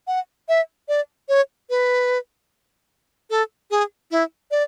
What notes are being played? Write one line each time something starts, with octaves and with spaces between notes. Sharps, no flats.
F#5
E5
D5
C#5
B4
A4
G#4
E4
D5